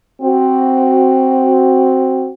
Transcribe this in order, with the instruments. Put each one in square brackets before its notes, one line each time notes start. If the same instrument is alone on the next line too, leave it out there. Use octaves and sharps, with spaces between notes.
[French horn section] C4 F#4